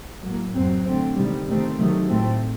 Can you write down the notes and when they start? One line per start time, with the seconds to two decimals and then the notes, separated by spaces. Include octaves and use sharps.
0.22 A2 F#3 A#3
0.54 F#2 F#3 C4
0.85 D3 A3 C4
1.16 C3 D#3 G3
1.46 C3 D#3 A3 C4
1.78 C3 D#3 F#3 A3
2.09 A2 A3 C4